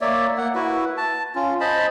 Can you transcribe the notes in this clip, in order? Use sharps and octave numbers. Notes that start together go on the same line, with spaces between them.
A#3 C#5 D5 E5
A#3 F#5
E4 F#4 B4
A5
C#4 F4
C5 D#5 A5 B5